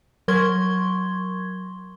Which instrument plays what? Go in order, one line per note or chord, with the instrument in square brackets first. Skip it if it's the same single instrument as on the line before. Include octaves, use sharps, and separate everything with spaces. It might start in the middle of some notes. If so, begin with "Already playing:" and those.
[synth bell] F#3 A#4 C6 C#6 G#6 G7